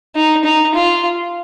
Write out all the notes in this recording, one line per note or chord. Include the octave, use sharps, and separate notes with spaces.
D#4
D#4
F4